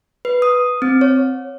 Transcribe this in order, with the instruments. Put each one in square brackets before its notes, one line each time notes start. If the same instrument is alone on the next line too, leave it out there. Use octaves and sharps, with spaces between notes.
[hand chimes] B4
D#6
C4
C#5